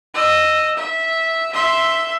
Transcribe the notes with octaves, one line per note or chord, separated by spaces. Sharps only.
D#5 E6
E5
E5 C6